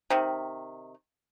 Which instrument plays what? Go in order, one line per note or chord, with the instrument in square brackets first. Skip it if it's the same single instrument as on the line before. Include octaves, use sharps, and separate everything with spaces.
[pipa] C3 D#3